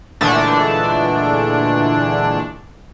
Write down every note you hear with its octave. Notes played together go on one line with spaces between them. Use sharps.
A#2 D3 E3 G#3 A3 D4